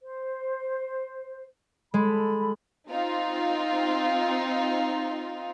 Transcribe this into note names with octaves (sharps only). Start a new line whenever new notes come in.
C5
G#3 A4 B5
C4 D#4 F4